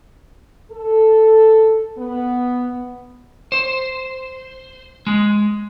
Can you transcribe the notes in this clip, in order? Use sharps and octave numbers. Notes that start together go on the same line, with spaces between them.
A4
B3
C5
G#3